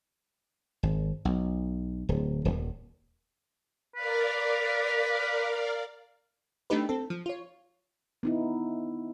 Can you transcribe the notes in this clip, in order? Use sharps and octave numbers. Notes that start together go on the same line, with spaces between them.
G#1
B1
D1
D#1
A#4 B4 D5 F5
A3 B3 D4 D#4 G4 B4
C4 A4
F3
F4 C#5
B3 D#4 E4